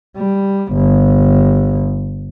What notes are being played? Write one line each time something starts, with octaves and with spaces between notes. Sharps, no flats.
G3
G1